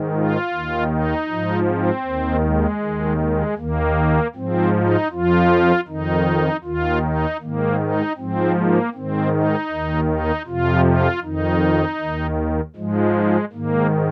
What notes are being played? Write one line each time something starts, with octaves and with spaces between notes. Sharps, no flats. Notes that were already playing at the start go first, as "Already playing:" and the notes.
Already playing: G#2 D#3
F4
D#2 D#3
D#4
G#2 F3
C4
D#2 D#3
G#3
D#2 D#3
G#3
D#2 D#3 A#3
G#2 F3 C4
D#4
F2 F3 F4
F2 D#3 D#4
D#2 D#3 F4
D#4
G#2 D#3 A#3
D#4
G#2 F3 C4
A#3
G#2 D#3 C4
D#4
D#2 D#3
D#4
F2 C3 F3 F4
F4
F2 D#3 D#4
D#2 D#3
G#2 F3 G#3
G#2 D#3 A#3